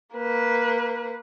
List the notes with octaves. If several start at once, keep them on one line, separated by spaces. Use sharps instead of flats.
A#3 B4